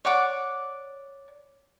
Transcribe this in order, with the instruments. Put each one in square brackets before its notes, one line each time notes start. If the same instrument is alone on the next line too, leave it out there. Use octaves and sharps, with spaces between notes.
[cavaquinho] C#5 D5 F#5 D6